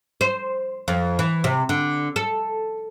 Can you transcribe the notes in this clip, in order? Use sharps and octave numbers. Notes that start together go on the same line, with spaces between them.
C5
F2
E3
C3
D3
A4